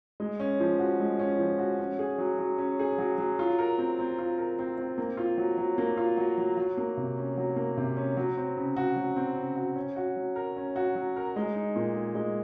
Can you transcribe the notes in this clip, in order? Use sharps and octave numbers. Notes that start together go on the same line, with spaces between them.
G#3
C#4
F3
F#4
G#3
C#4
F3
F#4
C#4
G#4
F#3
F#3
C#4
G#4
F#3
F#3
F4
A#4
C4
C4
F4
A#4
C4
C4
A#3
F4
F#3
F#3
A#3
F4
F#3
F#3
F#3
A#3
C3
C#4
F#3
A#3
C3
C#4
F#3
C4
C#3
F#4
F#3
C4
C#3
F#4
C#4
F#4
F#3
A#4
C#4
F#4
F#3
A#4
G#3
D#4
A#2
G#4
G#3